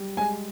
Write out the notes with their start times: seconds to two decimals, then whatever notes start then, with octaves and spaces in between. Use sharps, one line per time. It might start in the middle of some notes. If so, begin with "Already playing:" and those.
Already playing: G3
0.17 G#3 G#5